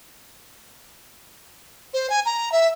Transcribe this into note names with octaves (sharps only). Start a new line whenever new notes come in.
C5
G#5
A#5
E5